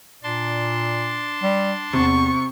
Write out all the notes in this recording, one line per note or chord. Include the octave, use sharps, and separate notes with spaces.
A#2 D4 A5 C6
G3
E2 C3 C#6